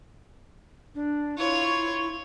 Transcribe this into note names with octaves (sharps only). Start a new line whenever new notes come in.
D4
E4 F4 C#5